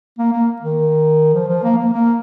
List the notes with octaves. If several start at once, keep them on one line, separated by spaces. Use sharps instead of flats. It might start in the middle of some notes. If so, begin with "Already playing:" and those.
A#3
A#3
D#3
F3
F3
A#3
A#3
A#3